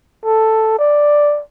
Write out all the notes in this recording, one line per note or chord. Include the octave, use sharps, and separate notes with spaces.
A4
D5